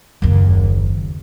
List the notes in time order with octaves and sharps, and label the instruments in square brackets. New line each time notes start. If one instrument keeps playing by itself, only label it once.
[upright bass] F#1 D#2